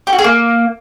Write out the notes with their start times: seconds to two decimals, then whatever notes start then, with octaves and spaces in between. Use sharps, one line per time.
0.07 G4
0.13 F#4
0.19 G#4
0.24 A#3